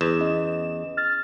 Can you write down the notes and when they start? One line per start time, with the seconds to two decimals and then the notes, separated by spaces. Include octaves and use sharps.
0.01 E2 E7
0.19 C#4 D#5
0.97 F6 A6